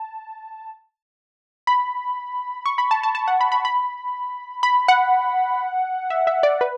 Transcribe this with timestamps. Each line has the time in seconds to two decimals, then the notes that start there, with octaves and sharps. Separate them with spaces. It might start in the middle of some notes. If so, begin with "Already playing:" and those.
Already playing: A5
1.67 B5
2.66 C#6
2.78 B5
2.91 A5
3.03 A5
3.15 A5
3.28 F#5
3.41 B5
3.52 B5
3.65 B5
4.63 B5
4.88 F#5
6.10 E5
6.27 E5
6.43 D5
6.61 B4